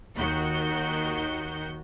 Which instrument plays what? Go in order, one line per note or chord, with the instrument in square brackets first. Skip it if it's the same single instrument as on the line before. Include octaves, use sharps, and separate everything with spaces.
[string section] D#2 D#3 F#4 G6 C#7